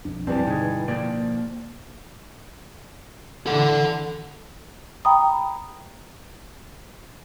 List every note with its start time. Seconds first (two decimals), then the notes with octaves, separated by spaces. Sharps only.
0.05 B1 F2 D4
0.27 G2 E3 G3 C4 G4
0.47 B2 D3 D#4 G#4
0.88 F3 A#3 D5 G5
3.46 D3 E3 A4 F#5
5.05 G5 A#5 B5 D#6